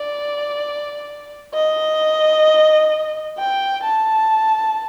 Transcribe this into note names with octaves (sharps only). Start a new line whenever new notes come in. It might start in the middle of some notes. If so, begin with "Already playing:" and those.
Already playing: D5
D#5
G5
A5